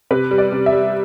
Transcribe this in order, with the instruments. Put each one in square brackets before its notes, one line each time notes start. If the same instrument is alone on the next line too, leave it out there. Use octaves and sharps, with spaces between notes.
[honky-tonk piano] C3 B4
G3
D5
C3
E5
G3